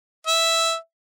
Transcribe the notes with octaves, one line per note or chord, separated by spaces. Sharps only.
E5